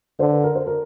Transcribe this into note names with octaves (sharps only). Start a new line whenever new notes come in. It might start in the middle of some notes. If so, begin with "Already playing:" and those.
D3 C5
B4
A#4
C5
A#4